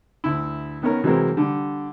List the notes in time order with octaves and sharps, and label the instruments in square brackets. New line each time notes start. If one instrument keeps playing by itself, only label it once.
[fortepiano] D2 E4
D#3 B3 C#4 A#4
C3 E3 F#3 G#3 C4 A#4
D3 G3